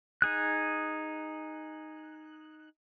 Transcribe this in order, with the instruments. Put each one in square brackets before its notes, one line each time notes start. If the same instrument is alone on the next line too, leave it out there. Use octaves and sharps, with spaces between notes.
[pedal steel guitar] D#4 G#4 F#6